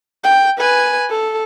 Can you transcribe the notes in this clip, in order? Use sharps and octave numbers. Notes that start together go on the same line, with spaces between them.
G5
B4 G#5
A4